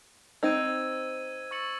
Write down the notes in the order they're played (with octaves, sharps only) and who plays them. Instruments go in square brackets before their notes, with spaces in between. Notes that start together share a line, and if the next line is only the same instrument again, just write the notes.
[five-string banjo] C4 D#4 [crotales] E6 G#6 D#7
[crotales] C#6 E6 A6 C#7 F#7